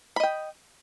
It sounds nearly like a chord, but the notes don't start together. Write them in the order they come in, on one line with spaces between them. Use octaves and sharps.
B5 D#5 G5